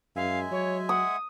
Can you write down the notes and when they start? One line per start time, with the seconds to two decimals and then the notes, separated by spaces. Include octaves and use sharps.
0.16 F#2 G#3 E5 F5 G#5
0.52 F#3 C#5
0.89 F#5 D#6